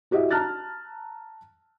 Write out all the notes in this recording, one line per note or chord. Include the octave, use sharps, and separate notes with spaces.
E4 F#4 G4 D#5 E5
A5 A#5 F6 F#6 A6